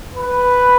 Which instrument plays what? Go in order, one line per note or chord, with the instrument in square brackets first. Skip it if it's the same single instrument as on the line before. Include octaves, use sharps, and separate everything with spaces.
[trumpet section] B4